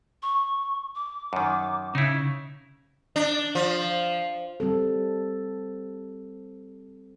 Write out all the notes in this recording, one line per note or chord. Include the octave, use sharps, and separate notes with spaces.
C#6
D6
F#2 D#3
C#3 D#4 E4
D4
F3
G3 C4 A4